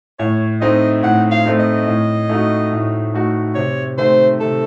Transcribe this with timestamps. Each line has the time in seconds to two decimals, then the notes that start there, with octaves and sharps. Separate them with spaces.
0.19 A2 C#5
0.61 A3 C4 D#4 D#5
1.03 A2 F#5
1.31 F5
1.46 A3 C4 D#4
1.60 D#5
1.88 A2
2.30 A3 D#4 F#4
2.72 A2
3.14 A3 D#4 F#4
3.55 C3 C#5
3.98 D#3 A3 C4 C5
4.40 C3 A4